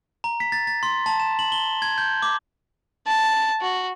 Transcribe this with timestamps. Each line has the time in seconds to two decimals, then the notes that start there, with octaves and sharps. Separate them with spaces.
0.24 A#5
0.40 B6
0.52 A6
0.67 A6
0.83 C6
1.06 A5
1.20 E7
1.39 F#7
1.52 G7
1.82 G#6
1.98 G6
2.22 D6
3.07 A5
3.61 F#4